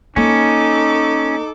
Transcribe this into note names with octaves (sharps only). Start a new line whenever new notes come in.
A#3 C#4 D#4 A4 D6